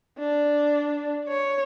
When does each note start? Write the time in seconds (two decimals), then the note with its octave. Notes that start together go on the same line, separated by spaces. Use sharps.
0.19 D4
1.28 C#5